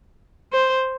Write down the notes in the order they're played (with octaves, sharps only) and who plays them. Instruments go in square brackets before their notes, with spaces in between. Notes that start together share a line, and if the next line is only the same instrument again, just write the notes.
[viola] C5